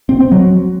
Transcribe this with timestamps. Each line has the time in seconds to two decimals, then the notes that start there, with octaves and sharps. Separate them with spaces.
0.09 C4
0.20 C4
0.32 F#3